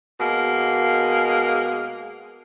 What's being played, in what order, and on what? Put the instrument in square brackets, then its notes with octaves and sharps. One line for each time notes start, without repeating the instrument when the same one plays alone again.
[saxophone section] B2 G#3 A#3